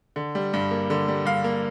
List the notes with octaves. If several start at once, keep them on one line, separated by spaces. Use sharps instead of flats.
D3
G3
G2
A#3
D3
G3
G2 F5
A#3